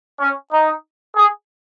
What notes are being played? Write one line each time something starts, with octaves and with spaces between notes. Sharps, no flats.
C#4
D#4
G#4